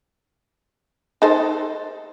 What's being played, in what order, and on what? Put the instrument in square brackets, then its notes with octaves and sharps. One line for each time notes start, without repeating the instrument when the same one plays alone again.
[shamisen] D#4 A4 C5